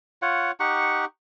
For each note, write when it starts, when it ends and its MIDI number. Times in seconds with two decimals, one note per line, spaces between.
0.22 0.51 65
0.22 0.51 73
0.22 0.51 78
0.60 1.05 63
0.60 1.05 67
0.60 1.05 78
0.60 1.05 85